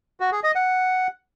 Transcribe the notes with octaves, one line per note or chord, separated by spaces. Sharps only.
F#4
G#4
D#5
F#5